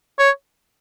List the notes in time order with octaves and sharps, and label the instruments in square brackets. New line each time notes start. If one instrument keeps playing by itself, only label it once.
[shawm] C#5